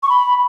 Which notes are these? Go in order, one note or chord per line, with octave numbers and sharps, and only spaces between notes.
C#6
B5